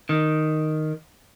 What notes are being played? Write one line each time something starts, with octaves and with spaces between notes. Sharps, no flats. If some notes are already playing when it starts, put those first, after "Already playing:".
D#3